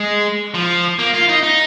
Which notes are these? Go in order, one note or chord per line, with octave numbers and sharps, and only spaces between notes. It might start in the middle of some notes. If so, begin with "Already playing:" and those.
Already playing: G#3
F3
A#3
F4
D#4
D#4